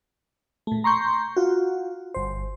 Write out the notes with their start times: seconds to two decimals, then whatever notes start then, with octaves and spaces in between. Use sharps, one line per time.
0.67 A#2 A3
0.84 A#5 C6 C#6 G6
1.36 F4 F#4
2.14 G1 C5